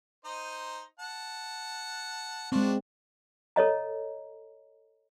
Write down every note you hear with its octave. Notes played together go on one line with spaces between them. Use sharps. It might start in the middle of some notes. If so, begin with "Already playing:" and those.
D#4 C5 D#5
F#5 A5
G#3 C4 D4 F4 F#4
A4 C#5 D#5 A#5